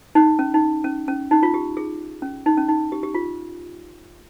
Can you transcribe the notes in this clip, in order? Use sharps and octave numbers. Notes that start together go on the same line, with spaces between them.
D#4
C#4
D#4
C#4
C#4
D#4
F4
G4
G#4
C#4
D#4
C#4
D#4
G4
G4
F4